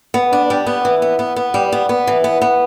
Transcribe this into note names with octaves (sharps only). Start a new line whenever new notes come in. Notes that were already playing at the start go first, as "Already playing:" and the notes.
B3
D4
G3
B3
E3
B3
B3
B3
G3
B3
B3
E3
B3
B3